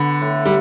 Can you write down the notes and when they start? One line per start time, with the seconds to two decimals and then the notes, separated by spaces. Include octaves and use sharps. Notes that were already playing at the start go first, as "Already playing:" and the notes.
Already playing: D3 B3
0.22 A2
0.46 G3